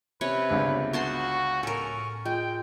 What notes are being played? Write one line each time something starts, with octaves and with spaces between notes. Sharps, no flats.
C3 C#4 B4 C#5
G1 C#2 D4
B3 F#4 A5 C6
A2 C#4 A4 A#4
G#3 F4 G5